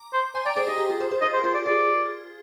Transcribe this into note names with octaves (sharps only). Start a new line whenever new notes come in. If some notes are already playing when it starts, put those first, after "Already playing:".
Already playing: A#5 D6
C5
C5 G#5 C6
D5 G5 A#5
G#4 C5 D5
G4 D#5
G4
F4 G#4
G#4 C5
G#4 C5
F4 G#4 D#5
C5
A#4
F4 G#4 C5
D5
F4 G#4 D5